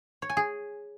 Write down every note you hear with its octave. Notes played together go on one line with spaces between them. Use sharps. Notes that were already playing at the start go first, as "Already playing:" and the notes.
C#5
G#5
G#4